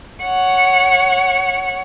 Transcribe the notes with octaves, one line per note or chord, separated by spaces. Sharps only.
C#5 F#5